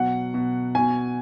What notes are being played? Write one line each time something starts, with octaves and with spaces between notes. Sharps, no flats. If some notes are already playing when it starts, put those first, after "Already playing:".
Already playing: B2 F#3 F#5
B2
B2 G#5